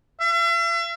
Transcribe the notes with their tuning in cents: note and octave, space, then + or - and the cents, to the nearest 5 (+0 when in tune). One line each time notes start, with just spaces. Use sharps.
E5 +45